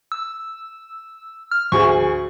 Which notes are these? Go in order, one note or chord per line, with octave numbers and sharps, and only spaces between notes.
E6
F6
D2 G#4 C#6